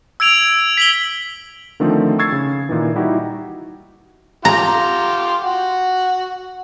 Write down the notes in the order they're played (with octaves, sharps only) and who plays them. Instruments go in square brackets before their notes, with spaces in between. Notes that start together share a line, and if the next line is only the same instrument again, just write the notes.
[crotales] E6 G#6 D7 F7
B6 F#7 G7
[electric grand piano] D3 D#3 F3 A3 C4
C#6 E6 G#6 A6 C7
C#3
A#2 D#3 E3
G3 D#4 E4 F#4 G4
[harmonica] F4 G4 [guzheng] A#5
[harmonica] F#4